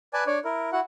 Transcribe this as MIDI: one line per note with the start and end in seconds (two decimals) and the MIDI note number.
0.13 0.24 71
0.13 0.24 74
0.13 0.24 80
0.13 0.24 81
0.27 0.39 62
0.27 0.39 73
0.27 0.39 74
0.45 0.70 64
0.45 0.70 70
0.72 0.80 64
0.72 0.80 66
0.72 0.80 78